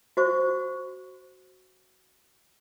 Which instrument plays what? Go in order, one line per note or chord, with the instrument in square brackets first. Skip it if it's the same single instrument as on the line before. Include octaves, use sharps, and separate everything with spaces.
[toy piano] F#4 C5 C#6